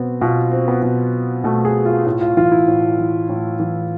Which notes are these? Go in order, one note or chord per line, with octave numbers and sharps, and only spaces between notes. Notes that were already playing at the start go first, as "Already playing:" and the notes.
Already playing: B2 B3 C4
B2 F4
C4
B3
B2
B2 A3
G#4
F4
A2 F4
F4
E3 F4
E4
A2
E3
A2
E3